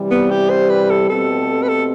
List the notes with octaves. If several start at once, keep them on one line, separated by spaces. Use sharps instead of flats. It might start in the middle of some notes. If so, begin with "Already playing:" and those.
Already playing: C3 E3 G3
B3
G4
C5
B4
A4
B2 A3 C4 G4 A4
B4
A4